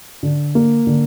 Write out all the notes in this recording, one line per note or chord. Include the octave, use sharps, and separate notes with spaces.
D3
A#3
D3